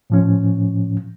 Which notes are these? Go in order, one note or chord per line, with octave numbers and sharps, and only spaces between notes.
A2 F3 C#4